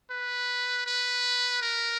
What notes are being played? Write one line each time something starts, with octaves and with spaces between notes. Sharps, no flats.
B4
B4
A#4